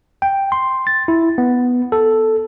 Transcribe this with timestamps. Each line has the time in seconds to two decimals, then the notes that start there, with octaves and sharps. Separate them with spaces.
0.22 G5
0.52 C6
0.87 A6
1.08 E4
1.38 B3
1.92 A4